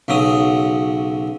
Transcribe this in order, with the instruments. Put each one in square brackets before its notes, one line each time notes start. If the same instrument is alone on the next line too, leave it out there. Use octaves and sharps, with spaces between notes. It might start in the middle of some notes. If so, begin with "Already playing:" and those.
[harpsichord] B1 C#3 F#3 D#6